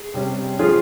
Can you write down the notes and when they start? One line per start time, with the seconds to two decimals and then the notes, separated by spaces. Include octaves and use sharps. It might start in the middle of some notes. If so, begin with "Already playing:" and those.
Already playing: G#4
0.14 C3 G3 C#4
0.59 F3 G#3 C#4 F4 G#4